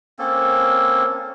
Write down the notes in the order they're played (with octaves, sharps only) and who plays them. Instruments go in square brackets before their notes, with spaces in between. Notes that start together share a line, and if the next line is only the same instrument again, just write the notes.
[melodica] A#3 C4 C#4 A4